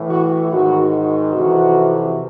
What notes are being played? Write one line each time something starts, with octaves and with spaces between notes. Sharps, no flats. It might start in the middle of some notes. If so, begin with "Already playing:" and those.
Already playing: A2 E3
F#4
G#2 D#3 F#4
F2 C3 E3 F#4